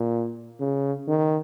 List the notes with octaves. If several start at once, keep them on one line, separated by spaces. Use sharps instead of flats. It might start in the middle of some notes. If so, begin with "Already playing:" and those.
Already playing: A#2
C#3
D#3